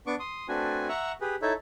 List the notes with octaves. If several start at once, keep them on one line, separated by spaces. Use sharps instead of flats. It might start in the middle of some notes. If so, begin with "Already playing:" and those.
B3 D4 C#6 D6
C6 D#6
A3 C4 D4 F#4 B4 G#5
E5 F#5 A#5 C#6 E6
G4 G#4 B4
D#4 E4 A4 C#5 E5